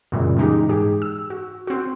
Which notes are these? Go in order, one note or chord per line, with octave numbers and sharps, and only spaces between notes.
F#2 A#2 C#3 E3 G3 G#3
E3 G#3 D#4 G4
G#2 G4 G#4
E6
F#4
C4 F#4